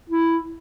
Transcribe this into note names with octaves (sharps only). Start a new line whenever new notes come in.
E4